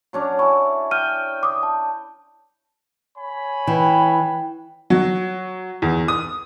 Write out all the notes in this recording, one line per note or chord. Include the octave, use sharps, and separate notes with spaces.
F#3 C#4 D4
E4 G#5 C#6
G5 F6 D#7
D6 D#6
A5
C#5 G#5 B5
E3 F#5 G5
F#3
E2
D#6